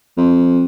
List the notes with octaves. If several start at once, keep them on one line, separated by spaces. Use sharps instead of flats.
F2